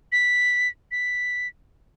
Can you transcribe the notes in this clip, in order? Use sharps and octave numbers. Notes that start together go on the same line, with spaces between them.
B6
B6